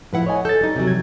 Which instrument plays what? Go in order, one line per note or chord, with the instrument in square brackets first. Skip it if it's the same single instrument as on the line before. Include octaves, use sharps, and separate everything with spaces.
[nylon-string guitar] A2 B4 F#5 [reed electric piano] F3 E4
[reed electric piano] C#5 D#5 G#5
[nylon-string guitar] A4 [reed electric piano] G6 A6
[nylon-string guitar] G3 D#4
C3 F#3
[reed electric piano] F3 G#6